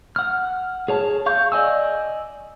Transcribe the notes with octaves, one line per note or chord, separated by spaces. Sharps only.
F#5 F6
G#4 C#5 A5
F5 C#6 G6
D5 D#5 G#5 E6